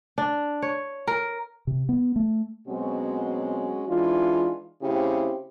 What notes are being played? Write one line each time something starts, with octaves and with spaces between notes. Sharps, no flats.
D4
C#5
A#4
C3
B3
A3
B2 F#3 G#3 C4 C#4 F#4
E3 G#3 D4 D#4 F4
C#3 A3 C4 E4 G4